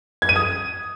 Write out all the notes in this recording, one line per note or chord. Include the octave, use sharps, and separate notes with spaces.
G#6
D#7
D#6